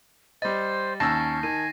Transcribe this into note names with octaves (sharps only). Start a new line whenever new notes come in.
G3 C5 D#5 A6
D#2 C#4 A5 E6 A#6 C7
D#3 G#5 D#7